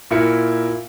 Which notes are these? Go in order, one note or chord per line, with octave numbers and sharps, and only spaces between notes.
A#2 E4 A#4 C#7